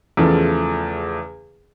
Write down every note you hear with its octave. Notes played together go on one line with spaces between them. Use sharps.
E2 C#3 F3 A3